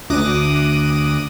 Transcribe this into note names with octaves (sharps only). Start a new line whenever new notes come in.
D2 D6 D#6 F#6 A#6 D#7